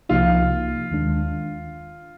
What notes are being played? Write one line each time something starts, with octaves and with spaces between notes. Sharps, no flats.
C2 C3 F3 A#3 D#4 F4
D#2 D#3 G#3 D4